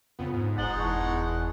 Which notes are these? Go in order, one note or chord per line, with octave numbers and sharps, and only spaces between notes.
F2 C#3 B3 F4
G#2
F1 G#3 D#4 F#5 A6 F#7 G7
E2 E4 A5 C#6